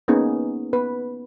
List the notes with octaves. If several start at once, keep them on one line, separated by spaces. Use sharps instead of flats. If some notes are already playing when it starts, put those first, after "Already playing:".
A#3 B3 C#4 D#4 G#4
B3 B4